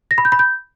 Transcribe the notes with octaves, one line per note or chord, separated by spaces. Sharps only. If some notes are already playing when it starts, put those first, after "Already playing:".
A#6
B5
G6
B5
G6